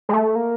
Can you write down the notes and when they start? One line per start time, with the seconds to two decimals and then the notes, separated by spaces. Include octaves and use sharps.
0.09 G#3
0.13 A3
0.36 A#3